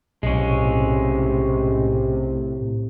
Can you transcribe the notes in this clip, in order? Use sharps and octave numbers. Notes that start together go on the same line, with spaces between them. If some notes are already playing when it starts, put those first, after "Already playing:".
B1 A2 C3 G#3 C#4